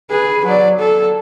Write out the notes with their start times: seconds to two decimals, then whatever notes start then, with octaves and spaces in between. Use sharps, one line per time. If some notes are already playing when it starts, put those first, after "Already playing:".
0.10 G#4 B4
0.45 F#3 D5
0.79 A4